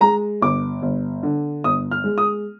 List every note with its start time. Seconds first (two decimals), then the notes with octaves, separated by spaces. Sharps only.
0.01 G#3 A#5
0.41 G1 D6
0.82 G1
1.23 D3
1.64 G1 D#6
1.91 F6
2.04 G#3
2.18 D#6